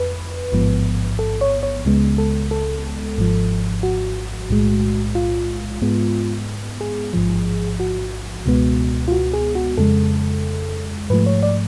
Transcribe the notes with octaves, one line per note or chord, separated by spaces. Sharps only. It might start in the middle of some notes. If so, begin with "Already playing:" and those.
Already playing: F2 B4
A1 G#2 F3 B3
A4
C#5
C#5
C#2 C#3 G#3 B3
A4
A4
G#1 G#2 F3
F#4
B1 A2 G#3
F4
G#2 G#3 B3
G#4
A1 G#2 F3
F#4
C#2 B2 G#3 B3
F4
F#4
G#4
F#4
F2 C#3 G#3 A4
G#2 F3 A3 B4
C#5
D5